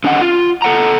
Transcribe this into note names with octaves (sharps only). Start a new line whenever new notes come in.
D3 C#4 D#5 F#5
F4
A4 F#5 A#5